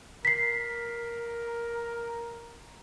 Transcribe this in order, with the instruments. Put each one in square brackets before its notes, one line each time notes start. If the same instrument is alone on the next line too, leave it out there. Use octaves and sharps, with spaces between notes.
[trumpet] A#4 [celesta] B6 C7